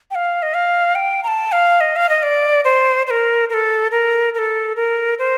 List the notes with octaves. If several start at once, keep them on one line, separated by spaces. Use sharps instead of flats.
G5
F5
D#5
F5
G5
A#5
A5
F5
D#5
F5
D#5
D5
C5
C5
A#4
A#4
A4
A#4
A#4
A4
A#4
C5